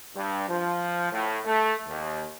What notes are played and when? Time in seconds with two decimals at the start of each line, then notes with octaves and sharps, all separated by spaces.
0.16 G2
0.49 F3
1.12 A2
1.45 A3
1.87 D#2